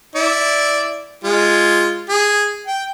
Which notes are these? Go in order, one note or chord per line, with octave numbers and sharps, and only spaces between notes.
E4 D5
G#3 F4
G#4
G5